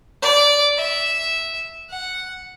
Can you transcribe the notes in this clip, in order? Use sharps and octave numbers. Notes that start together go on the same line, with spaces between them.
D5
E5
F#5